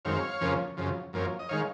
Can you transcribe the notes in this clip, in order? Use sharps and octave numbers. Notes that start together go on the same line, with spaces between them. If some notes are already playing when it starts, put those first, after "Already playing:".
F#2 D#3 G#3 C4 C#5 F5
F2 C#3 F3 A#3 C#4
F#2 C#3 F3
F#2 F3 A#3 C#4
D#5
D#3 G#3 C#5 F5